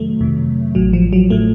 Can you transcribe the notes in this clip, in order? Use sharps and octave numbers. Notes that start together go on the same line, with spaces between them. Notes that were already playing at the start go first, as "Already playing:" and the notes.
Already playing: F2 C3 D#3 F#3 A3
F2 C3 D#3
A1 A2 F#3
F3
F#3
A2 A3